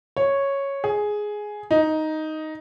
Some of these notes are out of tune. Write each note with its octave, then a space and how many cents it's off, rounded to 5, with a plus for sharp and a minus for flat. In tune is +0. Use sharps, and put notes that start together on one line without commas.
C#5 -5
G#4 +5
D#4 +5